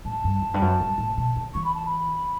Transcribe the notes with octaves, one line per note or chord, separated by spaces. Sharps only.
A2 A5
G2
F#2
G2
F#2
G2
A2
B2
D3
E3 C#6
B5
A5
B5